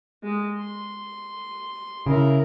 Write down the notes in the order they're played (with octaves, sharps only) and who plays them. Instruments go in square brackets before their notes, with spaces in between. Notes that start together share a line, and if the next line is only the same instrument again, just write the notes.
[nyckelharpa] G#3
C6
[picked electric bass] C#3 [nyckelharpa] E4 A#4